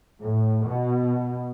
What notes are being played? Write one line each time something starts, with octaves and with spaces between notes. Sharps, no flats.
A2
B2